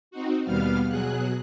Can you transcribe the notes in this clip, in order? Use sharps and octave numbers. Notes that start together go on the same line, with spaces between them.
C4 D#4 F#4
D#2 B2 G3 B3 F5 F6
B2 F#3 G#4 F#6